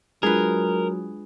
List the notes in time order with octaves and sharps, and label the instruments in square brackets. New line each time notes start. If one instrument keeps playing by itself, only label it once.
[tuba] F#3 [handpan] G#3 D4 F4 [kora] G#4 B4 [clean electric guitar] A#4